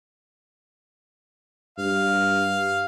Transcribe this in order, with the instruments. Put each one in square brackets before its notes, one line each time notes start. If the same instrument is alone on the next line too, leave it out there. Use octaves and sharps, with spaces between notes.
[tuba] G2 [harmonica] F5